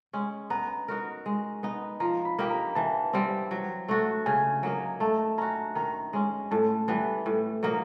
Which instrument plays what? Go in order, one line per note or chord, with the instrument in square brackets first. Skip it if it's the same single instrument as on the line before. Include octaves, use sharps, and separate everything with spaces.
[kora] G#3 C#4
[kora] B3 [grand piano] A#5
[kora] D#4 F#4 A#4
G#3
B3 D#4
[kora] F3 [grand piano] A#5
[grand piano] B5
[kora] A#3 D#4 G4
[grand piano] A#5
[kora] E3 [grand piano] A5
[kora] G3 C4
F#3
A3 D4 F#4
[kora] C#3 [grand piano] G#5
[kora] F#3 A#3 D#4
[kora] A3 [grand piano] A5
[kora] C#4 F#4 [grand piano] A#5
[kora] D#3 [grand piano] A#5
[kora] G#3 C#4
[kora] A2 [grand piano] A5
[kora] E3 G3 B3
A2
F#3 A#3 D#4